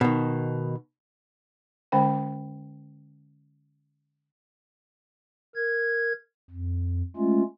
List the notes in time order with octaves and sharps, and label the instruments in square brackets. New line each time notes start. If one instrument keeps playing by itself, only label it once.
[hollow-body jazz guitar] B2 D#3
[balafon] D3 G#3 C#4 C5 G5
[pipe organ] A#4 G#6
F2
G#3 A3 C#4 F4